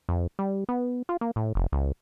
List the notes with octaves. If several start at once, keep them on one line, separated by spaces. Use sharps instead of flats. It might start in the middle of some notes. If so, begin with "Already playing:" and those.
F2
G3
B3
F4
A#3
A2
F1
C#2